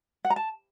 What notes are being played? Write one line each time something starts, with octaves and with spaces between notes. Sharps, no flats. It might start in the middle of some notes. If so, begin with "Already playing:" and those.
F#5
A#5
A5